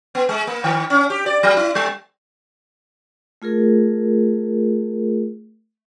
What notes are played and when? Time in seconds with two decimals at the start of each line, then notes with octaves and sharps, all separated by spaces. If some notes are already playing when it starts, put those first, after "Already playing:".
0.15 B3
0.29 G#3
0.47 A#3
0.64 D#3
0.90 C#4
1.10 G4
1.26 D5
1.43 F#3
1.57 E4
1.75 G3
3.42 A3 F4 G#4 A#4